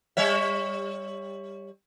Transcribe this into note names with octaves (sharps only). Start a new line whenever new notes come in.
G3 C#5 E5